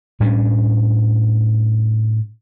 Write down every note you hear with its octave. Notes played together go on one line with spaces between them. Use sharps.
A2 G3 C#4 D4